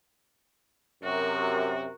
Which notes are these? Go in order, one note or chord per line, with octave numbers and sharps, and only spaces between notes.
F#2 C3 F#4 A#4